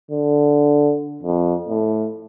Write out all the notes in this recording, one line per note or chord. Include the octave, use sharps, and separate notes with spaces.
D3
F2
A2